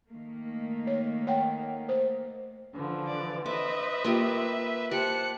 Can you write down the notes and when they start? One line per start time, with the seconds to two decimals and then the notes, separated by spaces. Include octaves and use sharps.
0.10 D#3 A3 A#3
0.87 C#5
1.27 C#5 F#5 G5
1.89 C5
2.73 D3 E3 F3
3.07 D5
3.46 B4 C5 D#5 E5 D6
4.04 A#3 F4 G4
4.91 G4 C5 A5 F#6 C#7